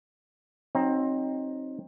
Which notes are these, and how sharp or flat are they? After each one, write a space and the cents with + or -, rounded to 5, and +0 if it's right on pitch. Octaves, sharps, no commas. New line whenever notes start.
F#3 +0 C4 +20 D#4 +0